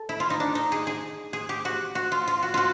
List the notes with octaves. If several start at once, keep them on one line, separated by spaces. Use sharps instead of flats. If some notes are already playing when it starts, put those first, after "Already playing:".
Already playing: A4
E4
F4
D#4
D4
D#4
G#4
G#4
G#4
G4
F#4
F#4
F4
F4
F#4
F4 F#4